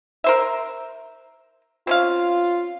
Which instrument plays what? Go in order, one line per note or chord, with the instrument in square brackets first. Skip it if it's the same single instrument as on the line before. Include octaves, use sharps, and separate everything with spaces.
[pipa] A#4 C5 E5
[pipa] C4 C#4 F5 [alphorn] F4